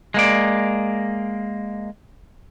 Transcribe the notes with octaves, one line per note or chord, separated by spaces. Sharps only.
G#3 A#3 D5